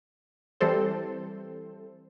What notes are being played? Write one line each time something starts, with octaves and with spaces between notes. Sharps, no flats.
E3 G3 C4 A4 C5